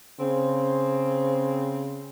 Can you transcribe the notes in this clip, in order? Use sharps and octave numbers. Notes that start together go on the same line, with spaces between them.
C#3 C4